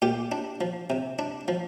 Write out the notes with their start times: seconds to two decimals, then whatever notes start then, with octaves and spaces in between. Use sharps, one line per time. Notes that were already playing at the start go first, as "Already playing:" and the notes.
0.02 A#2 G4
0.32 D4
0.61 F3
0.90 C3
1.19 D4
1.48 F3